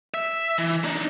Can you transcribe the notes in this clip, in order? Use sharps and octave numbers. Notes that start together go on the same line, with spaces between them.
E5
E3
D4 D#4